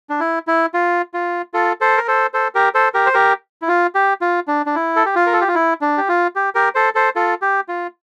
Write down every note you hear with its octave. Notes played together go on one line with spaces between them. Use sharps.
D4
E4
E4
F4
F4
F4 A4
A4 C5
A#4
A4 C5
A4 C5
G4 A#4
A4 C5
G4 A#4
C5
G4 A#4
E4
F4
G4
F4
D4
D4
E4
A4
G4
F4
A#4
A4
G4
F4
E4
D4
G4
F4
G4
G4 A#4
A4 C5
A4 C5
F4 A4
G4
F4